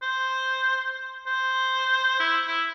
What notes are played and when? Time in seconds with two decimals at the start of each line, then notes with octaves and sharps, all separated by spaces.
0.02 C5
1.27 C5
2.20 E4
2.47 E4